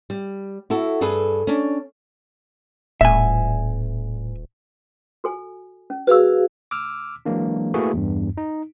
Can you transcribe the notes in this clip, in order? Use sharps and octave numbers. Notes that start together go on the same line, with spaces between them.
G3
E4 F#4 A4
G2 G#4 A4 B4
C#4 D4
D#1 A2 E5 G#5
F#4 A4 G#5
C#4
F#4 G#4 B4 F5 E6
D6 E6 F6
E3 F#3 G#3 A#3 D4
A3 A#3 E4 F#4 G#4 B4
E2 G2
D#4